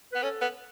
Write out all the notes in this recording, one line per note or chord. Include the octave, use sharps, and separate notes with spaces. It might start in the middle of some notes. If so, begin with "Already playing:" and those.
B3 B4
C#4 A4
B3